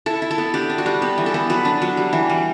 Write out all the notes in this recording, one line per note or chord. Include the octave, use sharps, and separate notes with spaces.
E4 A4
E4
A4
B3
D4 G4
D4
F#4
G3
B3 G4
E3
A4
B3
F#3 B4
D4
F#3
G3
E3
G3